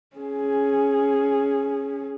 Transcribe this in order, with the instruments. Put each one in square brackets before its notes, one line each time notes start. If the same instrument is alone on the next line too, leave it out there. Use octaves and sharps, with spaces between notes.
[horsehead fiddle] C#4 G#4